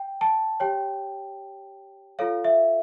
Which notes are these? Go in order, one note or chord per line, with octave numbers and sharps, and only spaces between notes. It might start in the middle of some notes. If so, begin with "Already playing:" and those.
Already playing: G5
A5
G4 C#5 G5
F4 A4 C#5 F5
E5